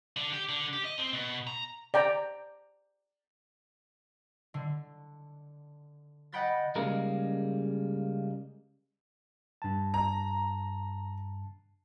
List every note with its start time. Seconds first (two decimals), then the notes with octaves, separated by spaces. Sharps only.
0.16 D3
0.33 G4
0.49 D3
0.73 G4
0.85 D#5
0.98 C4
1.13 B2
1.47 A#5
1.94 D5 G5 A#5
4.54 D3
6.32 D#5 F#5 G5 B5 G6 A6
6.76 C#3 G3 G#3 A#3 D#4 A#4
9.62 G2 A5
9.94 A#5